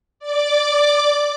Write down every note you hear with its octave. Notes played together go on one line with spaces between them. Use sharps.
D5 D6